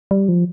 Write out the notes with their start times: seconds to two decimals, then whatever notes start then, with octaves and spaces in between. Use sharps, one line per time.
0.11 G3
0.29 F3